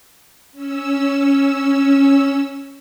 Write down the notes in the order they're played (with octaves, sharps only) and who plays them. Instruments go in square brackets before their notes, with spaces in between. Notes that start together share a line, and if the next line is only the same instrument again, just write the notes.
[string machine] C#4 E6